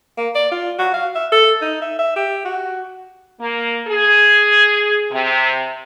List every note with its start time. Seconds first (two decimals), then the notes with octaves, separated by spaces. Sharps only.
0.18 A#3
0.35 D5
0.51 F4
0.79 F#4
0.94 F5
1.15 E5
1.32 A4
1.62 D#4
1.82 E5
1.99 E5
2.16 G4
2.45 F#4
3.39 A#3
3.88 G#4
5.11 C3